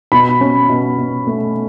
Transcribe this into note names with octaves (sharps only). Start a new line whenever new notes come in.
B2 B5
C#4
B2
B2
A3